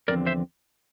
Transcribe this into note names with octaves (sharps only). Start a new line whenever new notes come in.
E2 D3 F3 C4 A#4 D5
C5 E5